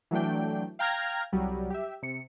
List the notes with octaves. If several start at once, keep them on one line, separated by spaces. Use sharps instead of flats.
E3 F#3 A3 D4 G5
F5 G5 A#5 F6 G#6 A#6
C2 F#3 G3
G4 E5
C3 C#7